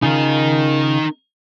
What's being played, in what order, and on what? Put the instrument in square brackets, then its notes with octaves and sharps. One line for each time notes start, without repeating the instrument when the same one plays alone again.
[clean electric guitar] C#3 F4 [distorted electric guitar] D#4 A#4